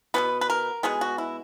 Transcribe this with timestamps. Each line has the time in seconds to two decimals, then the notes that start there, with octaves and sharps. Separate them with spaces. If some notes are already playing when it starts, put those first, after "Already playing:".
0.14 B2 G#3 B3 B4
0.41 B4
0.50 A#4
0.83 B2 G#3 B3 G#4
1.01 F#4
1.18 E4